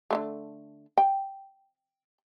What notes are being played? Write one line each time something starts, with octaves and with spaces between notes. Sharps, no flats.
D3 E3 A3
G5